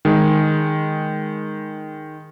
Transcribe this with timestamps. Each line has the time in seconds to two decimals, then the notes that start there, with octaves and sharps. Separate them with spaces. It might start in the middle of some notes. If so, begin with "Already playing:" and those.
0.05 D#3 G#3